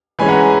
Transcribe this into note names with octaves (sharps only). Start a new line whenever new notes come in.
E3 G#3 C#4 G#5 B5
F#5 A#5
G#5